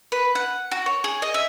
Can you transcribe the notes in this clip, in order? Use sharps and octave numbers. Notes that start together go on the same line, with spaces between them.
B4
F#5
F#4
C#5
G#4
D#5
E5